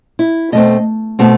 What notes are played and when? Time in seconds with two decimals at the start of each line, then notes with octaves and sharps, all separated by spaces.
0.19 E4
0.52 B2 A3 C4 D#5
1.19 B2 A3 C4